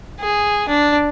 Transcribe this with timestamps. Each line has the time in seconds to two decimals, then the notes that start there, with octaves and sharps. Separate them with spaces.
0.20 G#4
0.69 D4